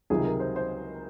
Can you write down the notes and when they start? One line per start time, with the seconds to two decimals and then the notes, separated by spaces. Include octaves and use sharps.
0.10 C#2 C3 D#3 F#3 G#4
0.24 A#4
0.40 C5
0.56 C5